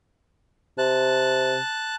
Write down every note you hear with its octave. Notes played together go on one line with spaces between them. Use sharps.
C3 A5 F#6